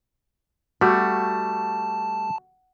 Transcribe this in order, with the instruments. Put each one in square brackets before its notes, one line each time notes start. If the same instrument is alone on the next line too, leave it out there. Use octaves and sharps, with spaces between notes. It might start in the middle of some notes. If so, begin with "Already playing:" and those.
[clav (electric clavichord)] G3 A3 [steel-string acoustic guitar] F#4 [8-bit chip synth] A5